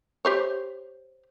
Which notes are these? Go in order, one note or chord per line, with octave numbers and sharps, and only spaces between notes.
G4 C5 C#5